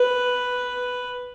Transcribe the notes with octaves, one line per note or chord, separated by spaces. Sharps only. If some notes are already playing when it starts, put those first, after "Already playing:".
Already playing: B4